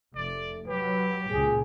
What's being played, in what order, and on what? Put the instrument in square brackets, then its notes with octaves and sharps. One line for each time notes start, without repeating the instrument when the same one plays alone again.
[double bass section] F1 [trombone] A3 [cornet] D5
[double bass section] F#3 [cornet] G4 [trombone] B4
[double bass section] C#2 A#2 [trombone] G#4